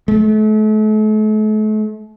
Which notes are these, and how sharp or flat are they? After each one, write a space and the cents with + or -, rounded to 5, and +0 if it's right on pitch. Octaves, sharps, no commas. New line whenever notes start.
A3 -40